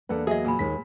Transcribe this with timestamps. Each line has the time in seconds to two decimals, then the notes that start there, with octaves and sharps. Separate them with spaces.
0.09 E2 A#3 D4 A4 B4 F#5
0.27 F#3 G#4 D#5 E5
0.44 A#2 G#4 G#5 B5
0.59 D#2 G#3 D#4 B6